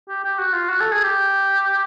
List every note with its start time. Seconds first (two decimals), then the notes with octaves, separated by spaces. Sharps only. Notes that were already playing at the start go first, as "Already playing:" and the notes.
0.09 G4
0.24 G4
0.39 F#4
0.54 F4
0.69 F#4
0.81 A4
0.92 G#4
1.03 G4